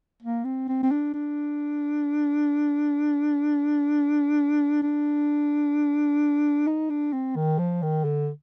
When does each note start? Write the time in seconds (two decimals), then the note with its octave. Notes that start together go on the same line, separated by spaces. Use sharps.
0.22 A#3
0.44 C4
0.68 C4
0.83 C4
0.91 D4
1.14 D4
4.83 D4
6.67 D#4
6.90 D4
7.13 C4
7.36 D#3
7.58 F3
7.82 D#3
8.04 D3